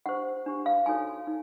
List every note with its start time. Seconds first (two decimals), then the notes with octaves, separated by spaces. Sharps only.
0.06 D4 G4 C5 F#5
0.46 D4 G4 C5
0.66 F5
0.86 D#4 F#4 A4 C#5 G#5
1.27 D#4